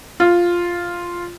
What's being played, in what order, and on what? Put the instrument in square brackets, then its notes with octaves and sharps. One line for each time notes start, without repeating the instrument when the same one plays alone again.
[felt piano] F4